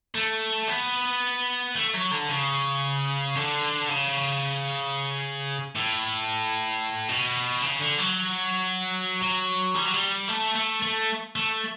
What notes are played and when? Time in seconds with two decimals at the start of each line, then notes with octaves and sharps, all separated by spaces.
0.15 A3
0.68 B3
1.75 A3
1.94 F#3
2.11 D3
2.29 C#3
3.35 D3
3.89 C#3
5.76 A2
7.09 B2
7.61 C#3
7.79 D3
7.98 F#3
9.23 F#3
9.75 G3
9.85 F#3
9.94 G3
10.29 A3
10.55 A3
10.82 A3
11.36 A3